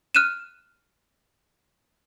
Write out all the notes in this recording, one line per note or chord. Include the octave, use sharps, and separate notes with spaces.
F6 F#6 D#7 E7